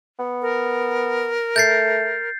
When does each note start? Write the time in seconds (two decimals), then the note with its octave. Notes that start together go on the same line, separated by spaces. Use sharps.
0.19 B3
0.42 A#4
1.56 A3 G6 A6 C7